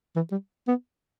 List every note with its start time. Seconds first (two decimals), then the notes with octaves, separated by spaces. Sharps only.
0.16 E3
0.32 G3
0.68 B3